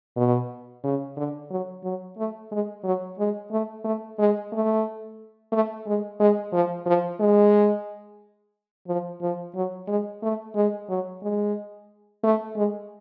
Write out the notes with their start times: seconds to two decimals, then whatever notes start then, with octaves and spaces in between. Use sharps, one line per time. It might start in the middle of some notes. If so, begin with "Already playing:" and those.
0.17 B2
0.84 C#3
1.17 D3
1.50 F#3
1.84 F#3
2.18 A3
2.51 G#3
2.84 F#3
3.18 G#3
3.51 A3
3.84 A3
4.19 G#3
4.52 A3
5.52 A3
5.87 G#3
6.20 G#3
6.53 F3
6.86 F3
7.20 G#3
8.88 F3
9.21 F3
9.55 F#3
9.88 G#3
10.22 A3
10.55 G#3
10.89 F#3
11.23 G#3
12.24 A3
12.56 G#3